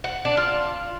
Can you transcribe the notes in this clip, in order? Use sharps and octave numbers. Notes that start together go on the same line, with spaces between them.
F#5
D4
F4